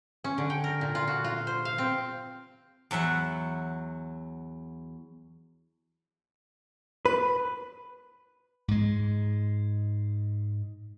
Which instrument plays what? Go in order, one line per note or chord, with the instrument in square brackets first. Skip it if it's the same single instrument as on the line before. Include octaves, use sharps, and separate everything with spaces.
[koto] C#4
D3
G5
A#4
A#2
F4
F#4
F4
C5
F5
C4
[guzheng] E2 F#3 E5 F#5
[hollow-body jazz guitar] B4
[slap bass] G#2 G#3